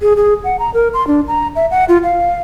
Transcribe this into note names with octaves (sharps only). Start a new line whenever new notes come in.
G#4
G#4
F#5
A#5
A#4
C6
D4
A#5
E5
F#5
F4
F5